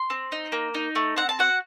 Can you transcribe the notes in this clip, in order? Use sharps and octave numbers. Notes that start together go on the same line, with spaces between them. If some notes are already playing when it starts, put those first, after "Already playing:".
Already playing: C6
C4
D#4
A#3
D#4
A3
C4 F#5
A5
F#4 F#5